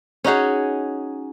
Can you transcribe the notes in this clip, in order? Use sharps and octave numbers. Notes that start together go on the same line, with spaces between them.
C#4 D#4 F#4 G#4